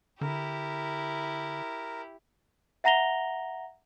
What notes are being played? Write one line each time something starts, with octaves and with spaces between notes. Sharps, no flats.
D3 E4 G4 A#4
E5 F#5 A#5 A#6 F7 G7